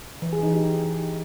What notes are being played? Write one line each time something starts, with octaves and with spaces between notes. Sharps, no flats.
E3
G#4
D#4
G4